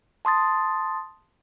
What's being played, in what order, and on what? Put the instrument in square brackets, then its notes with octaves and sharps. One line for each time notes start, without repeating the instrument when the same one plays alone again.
[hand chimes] A5 C6 D#6 A6